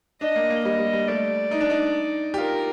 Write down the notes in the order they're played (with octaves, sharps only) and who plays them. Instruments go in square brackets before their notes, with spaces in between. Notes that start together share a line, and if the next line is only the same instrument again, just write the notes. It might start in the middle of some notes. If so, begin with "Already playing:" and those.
[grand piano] D4 [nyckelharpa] D#5
[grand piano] A#3
A#3
[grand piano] G3 [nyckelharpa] D#5
[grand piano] G3
G3
[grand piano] A3 [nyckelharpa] D5
[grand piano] D#4
D4
D#4
G4
[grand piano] F4 [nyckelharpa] A#4